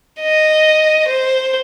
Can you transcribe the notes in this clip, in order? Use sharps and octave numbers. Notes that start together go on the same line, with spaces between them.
D#5
C5